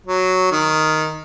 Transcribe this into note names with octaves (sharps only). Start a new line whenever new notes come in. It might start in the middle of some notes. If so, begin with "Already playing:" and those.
F#3
D#3